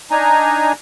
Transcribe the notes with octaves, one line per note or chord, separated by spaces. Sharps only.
D4 D#4 G#5 A#5